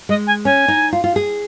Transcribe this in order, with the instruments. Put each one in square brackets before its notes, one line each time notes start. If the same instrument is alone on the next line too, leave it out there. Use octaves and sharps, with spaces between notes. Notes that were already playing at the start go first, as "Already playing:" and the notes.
[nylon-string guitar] G#3 [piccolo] D#5
[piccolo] G#5
[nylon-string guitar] C#4 [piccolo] G#5
[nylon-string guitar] D#4
F4
F4
G#4